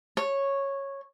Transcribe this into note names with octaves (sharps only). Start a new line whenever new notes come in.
C#5